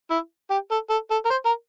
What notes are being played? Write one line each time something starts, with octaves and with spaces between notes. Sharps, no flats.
E4
G4
A4
A4
A4
A#4
C5
A#4